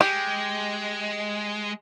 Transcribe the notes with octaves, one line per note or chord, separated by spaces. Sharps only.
G#3 G4